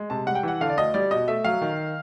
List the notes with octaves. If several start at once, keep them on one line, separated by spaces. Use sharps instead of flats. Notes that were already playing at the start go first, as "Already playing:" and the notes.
Already playing: G#3
C3 A5
G3 F#5
G5
E3 F#5
D3 F5
D5
D2 D#5
G3 D5
B2 D#5
A3 E5
F#3 F5
D#3